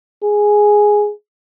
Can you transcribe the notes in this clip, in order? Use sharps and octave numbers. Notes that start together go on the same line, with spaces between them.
G#4